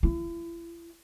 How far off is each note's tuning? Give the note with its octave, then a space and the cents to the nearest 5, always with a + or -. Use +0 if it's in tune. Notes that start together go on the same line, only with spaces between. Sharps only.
E4 +40